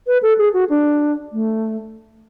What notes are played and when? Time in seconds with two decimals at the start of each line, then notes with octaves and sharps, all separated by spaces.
0.07 B4
0.23 A4
0.38 G#4
0.54 F#4
0.69 D4
1.32 A3